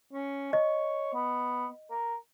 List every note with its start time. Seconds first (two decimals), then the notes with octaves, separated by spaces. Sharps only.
0.14 C#4
0.53 C#5 D#5
1.14 B3
1.91 A#4